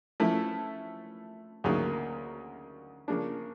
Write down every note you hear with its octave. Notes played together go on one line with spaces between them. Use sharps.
F3 A3 C#4 E4 A4
D2 C#3 F#3 A#3 D#4
C#3 F3 A#3 D4